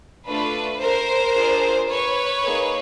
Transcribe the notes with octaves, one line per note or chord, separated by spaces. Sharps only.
A3 D4 F4 B4
A#4 C5
D4 F4 G#4
B4 C#5
A#3 D#4 G#4